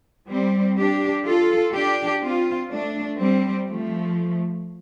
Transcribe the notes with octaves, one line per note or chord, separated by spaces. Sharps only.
G3 C4
D4 G4
F4 A4
D4 G4
C4 F4
A3 D4
G3 C4
F3 A3